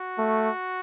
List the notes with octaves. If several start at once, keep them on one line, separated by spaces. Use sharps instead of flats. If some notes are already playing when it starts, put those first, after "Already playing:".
Already playing: F#4
A3